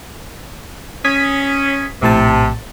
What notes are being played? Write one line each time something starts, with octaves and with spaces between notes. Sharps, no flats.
C#4 D#6 G#6 B6
A#1 A2 C3 A5